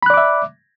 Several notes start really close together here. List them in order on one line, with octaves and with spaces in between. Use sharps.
B5 F#6 D5 D6 E5